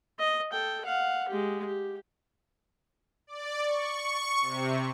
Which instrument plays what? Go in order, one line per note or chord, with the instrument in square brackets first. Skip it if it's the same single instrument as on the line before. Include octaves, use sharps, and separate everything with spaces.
[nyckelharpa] D#5
A4 G5
F5 F#5
G#3 G4
G4
[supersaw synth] D5
C#6
C3